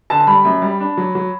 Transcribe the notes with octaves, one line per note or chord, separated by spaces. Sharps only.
D3 A5
A5
G3 B5
F#2
G3
D4
F#3
F#3